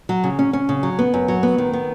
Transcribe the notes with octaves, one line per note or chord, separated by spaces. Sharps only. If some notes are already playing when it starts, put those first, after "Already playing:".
F#3
C#3
C#4
C#4
C#3
F#3
B3
F#2
F#3
B3
D#3
B3